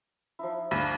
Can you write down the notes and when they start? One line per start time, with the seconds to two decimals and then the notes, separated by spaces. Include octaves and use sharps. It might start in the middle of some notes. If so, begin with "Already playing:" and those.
0.39 F3 D#4 E4
0.71 D2 D4 F5 B5